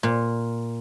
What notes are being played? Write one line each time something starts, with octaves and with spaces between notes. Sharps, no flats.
A#2